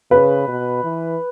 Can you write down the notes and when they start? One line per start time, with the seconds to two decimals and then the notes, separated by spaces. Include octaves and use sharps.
0.11 C#3 B4
0.48 B2
0.84 E3